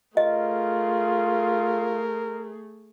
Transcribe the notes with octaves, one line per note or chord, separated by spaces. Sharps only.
A3 F4 G#4 A#4 D#5